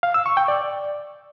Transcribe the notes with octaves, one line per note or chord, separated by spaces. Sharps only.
F5
E6
C#6
G5
D5